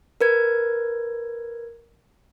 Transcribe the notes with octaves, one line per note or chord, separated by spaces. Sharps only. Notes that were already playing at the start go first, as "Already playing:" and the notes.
A#4 B4 G#6